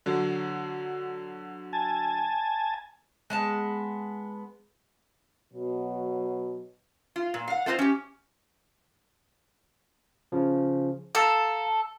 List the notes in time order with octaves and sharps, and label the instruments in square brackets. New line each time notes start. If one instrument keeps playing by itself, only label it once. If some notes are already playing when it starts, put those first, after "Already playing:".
[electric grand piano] D3 F#3
[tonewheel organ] G#5 A5
[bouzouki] G#3 B3 A5
[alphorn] B2 [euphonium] F#3
[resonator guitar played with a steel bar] F4
A#2
F5 F#5
A3 C4 F4 C5 D#5
C#4 G4
[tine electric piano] C#3 F3
[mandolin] A4 [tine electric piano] F5 A5 A#5